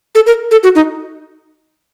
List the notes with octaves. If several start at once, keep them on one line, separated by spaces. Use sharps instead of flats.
A4
A#4
A4
F#4
D#4